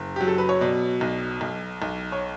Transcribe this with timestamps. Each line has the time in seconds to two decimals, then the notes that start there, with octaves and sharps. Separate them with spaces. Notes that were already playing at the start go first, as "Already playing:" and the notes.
Already playing: F#1
0.16 F#3 G4
0.27 A4
0.38 B4
0.49 C#5
0.61 B2 D5
1.01 B1
1.41 B1
1.82 B1
2.12 C#5